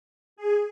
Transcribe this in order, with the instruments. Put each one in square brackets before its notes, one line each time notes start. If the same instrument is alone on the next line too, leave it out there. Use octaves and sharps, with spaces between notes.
[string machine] G#4